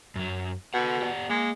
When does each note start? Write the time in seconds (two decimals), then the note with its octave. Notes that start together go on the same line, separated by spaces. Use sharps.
0.16 F#2 F#3
0.74 B2 A4 F#5
1.02 G4 D5 F#5
1.30 G#3 A#3